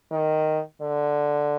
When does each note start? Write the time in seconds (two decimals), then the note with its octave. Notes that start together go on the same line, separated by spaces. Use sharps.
0.11 D#3
0.82 D3